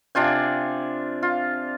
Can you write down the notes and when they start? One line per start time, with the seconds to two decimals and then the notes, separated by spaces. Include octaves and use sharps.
0.15 C3 D4 F4 G#5
1.23 F4